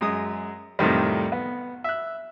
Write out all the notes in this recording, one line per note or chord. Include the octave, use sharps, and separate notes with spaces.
F#2 G#3 D#6
F2 A2 C3 D#3 G3
B3
E5 F#6